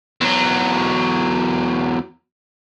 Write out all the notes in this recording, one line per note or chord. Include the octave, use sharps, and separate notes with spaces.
E2 F#3